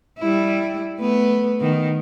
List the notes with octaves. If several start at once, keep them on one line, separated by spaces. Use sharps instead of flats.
G3 E4
A3 B3 B4
D#3 B3